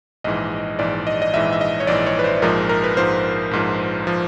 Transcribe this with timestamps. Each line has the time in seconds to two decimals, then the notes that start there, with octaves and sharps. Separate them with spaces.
0.24 A#1 G#2 E3 D#5
0.79 A#1 G#2 E3 D5
1.07 D#5
1.22 D#5
1.33 A#1 G#2 E3 E5
1.53 E5
1.61 D#5
1.80 C#5
1.87 A#1 G#2 E3 D5
2.06 C#5
2.19 B4
2.24 C5
2.42 A#1 G#2 F3 A#4
2.69 A#4
2.84 B4
2.97 A#1 G#2 F3 C5
3.51 A#1 G#2 F3
4.07 F3